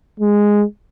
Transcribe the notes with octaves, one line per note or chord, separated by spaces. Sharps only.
G#3